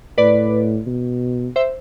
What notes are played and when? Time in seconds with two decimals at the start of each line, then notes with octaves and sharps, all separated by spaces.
0.18 A2 B4 D5
0.87 B2
1.56 C5 E5